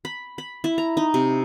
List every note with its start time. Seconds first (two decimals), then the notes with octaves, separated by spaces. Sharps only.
0.05 B5
0.38 B5
0.64 E4
0.78 A#5
0.97 D#4
1.14 C3